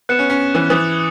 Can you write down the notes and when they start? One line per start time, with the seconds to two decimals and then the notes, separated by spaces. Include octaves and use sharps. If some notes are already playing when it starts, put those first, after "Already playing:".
0.09 B3 F#6 C#7 E7
0.19 C#4
0.30 C#4
0.55 E3
0.70 E3 D#6 A6 E7